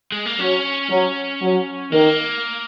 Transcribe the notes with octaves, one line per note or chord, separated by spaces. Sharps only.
G#3
A#3
F#3 C#4
F#3
F#3
D#3 A#3